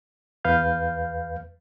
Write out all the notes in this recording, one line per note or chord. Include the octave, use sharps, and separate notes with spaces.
E2 B4 F5 G6